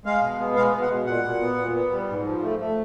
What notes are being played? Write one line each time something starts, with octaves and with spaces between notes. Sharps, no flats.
G#3 F5
B2
B3
G#3 F5
B2
F#5
B2
A#2 F#5
A#2
B3
A#2
B3
G3
G#2
F3
A3
A3